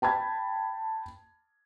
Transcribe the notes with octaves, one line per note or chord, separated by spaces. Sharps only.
G5 A5 B5 G#6